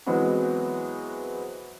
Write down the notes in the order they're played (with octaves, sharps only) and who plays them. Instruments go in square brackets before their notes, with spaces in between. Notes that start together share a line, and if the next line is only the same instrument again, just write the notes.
[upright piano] E3 F#3 G#3 B3 C4 F#4